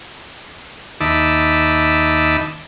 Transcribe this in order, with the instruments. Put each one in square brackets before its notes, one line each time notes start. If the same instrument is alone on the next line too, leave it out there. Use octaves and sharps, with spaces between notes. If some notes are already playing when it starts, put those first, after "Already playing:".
[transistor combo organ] D#2 D#4 E5 A5 B5 D6